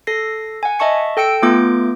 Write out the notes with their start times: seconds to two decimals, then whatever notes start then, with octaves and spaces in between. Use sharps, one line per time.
0.07 A4 A#6 C7
0.63 F#5 G#5
0.79 D#5 E5 A5 C#6 C#7
1.17 A4 G5 E6 C#7 D7
1.42 A3 B3 F4 D6 G6